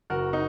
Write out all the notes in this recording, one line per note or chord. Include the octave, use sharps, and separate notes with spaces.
F#1 F#4 A#4
D#4